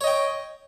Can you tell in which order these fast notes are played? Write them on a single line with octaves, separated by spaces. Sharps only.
C#5 D#5 G5